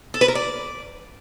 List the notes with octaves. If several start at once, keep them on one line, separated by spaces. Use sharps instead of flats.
A4
B4
A#4
D5